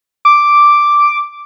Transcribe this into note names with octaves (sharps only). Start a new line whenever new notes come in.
D6